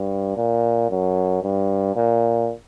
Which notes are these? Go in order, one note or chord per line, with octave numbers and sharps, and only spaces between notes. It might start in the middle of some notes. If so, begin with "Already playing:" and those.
Already playing: G2
A#2
F#2
G2
A#2